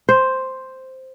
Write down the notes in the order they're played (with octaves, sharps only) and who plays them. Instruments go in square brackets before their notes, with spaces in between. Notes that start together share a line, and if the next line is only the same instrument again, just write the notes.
[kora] C5